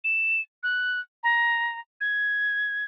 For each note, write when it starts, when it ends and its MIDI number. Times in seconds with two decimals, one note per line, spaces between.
0.04 0.41 100
0.63 1.00 90
1.23 1.79 82
2.01 2.85 92